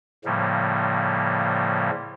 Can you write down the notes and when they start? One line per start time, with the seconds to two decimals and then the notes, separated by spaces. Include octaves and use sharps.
0.25 A2 C#3 F3 G3 A#3